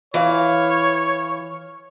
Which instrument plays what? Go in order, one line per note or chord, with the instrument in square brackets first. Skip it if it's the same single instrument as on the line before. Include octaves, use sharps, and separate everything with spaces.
[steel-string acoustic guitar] E3 F5 [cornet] C#5